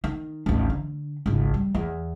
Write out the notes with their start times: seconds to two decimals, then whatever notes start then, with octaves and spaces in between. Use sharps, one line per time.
0.04 D#3
0.46 A1 D#2
0.70 D3
1.26 G#1 C#2
1.54 G3
1.75 E2